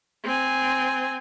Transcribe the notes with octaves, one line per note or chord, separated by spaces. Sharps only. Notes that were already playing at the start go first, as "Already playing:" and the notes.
C4 G#5